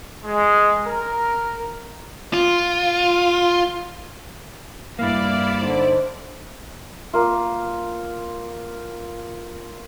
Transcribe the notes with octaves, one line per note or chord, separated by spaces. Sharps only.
G#3
A#4
F4
G2 A#3 E4 D5 F5
D3 D#4 C5
A#3 F4